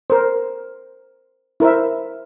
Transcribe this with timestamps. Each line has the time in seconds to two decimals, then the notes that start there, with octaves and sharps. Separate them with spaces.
0.10 A#4 C5
1.60 E4 A#4 C5 E5